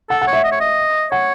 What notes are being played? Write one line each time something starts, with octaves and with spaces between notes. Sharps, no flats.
A4 F#5
F#5
C#5
E5
D#5
C#5
D#5
C#5 F#5